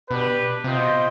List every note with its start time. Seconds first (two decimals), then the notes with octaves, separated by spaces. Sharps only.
0.10 B2 D4 G4 B4
0.64 C3 F4 C5 D#5 G5
0.77 B2